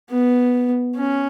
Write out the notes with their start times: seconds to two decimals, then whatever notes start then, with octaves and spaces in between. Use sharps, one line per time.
0.11 B3
0.96 C#4